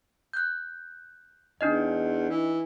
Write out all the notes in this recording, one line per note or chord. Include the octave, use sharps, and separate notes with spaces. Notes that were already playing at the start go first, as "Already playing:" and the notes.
F#6 G6
E2 D4 D#4 D#5
E3